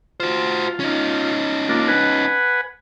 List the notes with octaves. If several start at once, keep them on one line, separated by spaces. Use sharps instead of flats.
F4 F#4 C5
C#4 D#4
A#3 D4 F4
B4 F#5 G#5